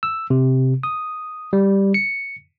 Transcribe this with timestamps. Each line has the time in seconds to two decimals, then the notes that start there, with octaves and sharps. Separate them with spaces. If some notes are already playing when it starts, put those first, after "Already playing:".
0.03 E6
0.30 C3
0.83 D#6
1.53 G3
1.94 C#7